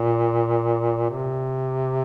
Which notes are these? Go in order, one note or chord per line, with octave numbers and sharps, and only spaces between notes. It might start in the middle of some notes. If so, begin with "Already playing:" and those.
Already playing: A#2
C3